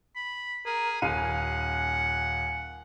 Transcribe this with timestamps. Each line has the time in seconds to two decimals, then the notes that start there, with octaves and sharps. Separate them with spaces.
0.16 B5
0.66 G#4 A#4
1.02 D#1 F5 F#5 G#5 D#7